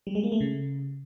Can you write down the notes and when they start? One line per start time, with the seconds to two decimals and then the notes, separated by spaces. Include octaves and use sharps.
0.07 G3
0.15 G#3
0.24 A#3
0.32 A3
0.40 C#3